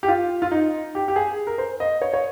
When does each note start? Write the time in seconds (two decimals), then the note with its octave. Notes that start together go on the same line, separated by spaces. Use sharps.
0.03 G4
0.08 F4
0.42 F4
0.51 D#4
0.95 G4
1.08 G4
1.16 G#4
1.47 A#4
1.58 C5
1.80 D#5
2.02 C#5
2.14 C#5